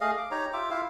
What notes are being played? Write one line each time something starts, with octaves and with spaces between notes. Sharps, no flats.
A3 G#4 D#5 F5
D6
D#4 G4 C#5 A#5
F4 G4 E5 D6
E4 F4 E5 F5